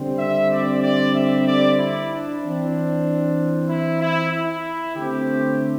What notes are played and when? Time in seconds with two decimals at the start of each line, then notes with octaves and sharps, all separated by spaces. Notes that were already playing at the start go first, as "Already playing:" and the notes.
Already playing: D3 G3 C4
0.19 E5
0.51 D5
0.83 D5
1.15 E5
1.47 D5
1.78 E4
2.10 D4
2.42 E3 C4
3.69 E4
4.01 E4
4.32 E4
4.96 D3 A3 C4 G4